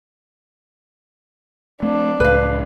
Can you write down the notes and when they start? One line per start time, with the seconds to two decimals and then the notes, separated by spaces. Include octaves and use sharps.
1.82 A3 C4 D4
2.20 C#2 A2 B4 F5